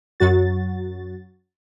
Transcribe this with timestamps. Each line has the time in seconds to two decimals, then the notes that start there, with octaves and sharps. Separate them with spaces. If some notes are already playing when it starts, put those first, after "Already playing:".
0.20 F#2 F#3 F#4 A6